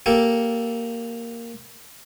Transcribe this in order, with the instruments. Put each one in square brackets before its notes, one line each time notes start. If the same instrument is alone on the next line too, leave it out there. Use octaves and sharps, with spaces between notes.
[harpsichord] A#3 G4 A4